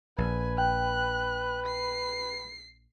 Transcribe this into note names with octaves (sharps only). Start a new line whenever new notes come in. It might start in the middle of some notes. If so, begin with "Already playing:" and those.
A#1 B4 G#5
G5 F#6
C7